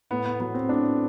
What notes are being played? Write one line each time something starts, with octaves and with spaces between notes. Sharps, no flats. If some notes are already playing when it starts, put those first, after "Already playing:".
A2 B3
B3
F#3 B3
C4
A2 D4